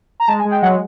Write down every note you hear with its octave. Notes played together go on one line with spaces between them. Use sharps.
A#5
G#3 A5
G#5
G#3
G5
F#3 F#5